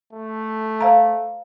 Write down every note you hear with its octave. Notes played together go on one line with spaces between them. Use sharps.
A3
C5 F5 A#5